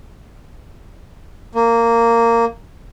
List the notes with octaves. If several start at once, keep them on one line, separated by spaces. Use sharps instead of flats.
A#3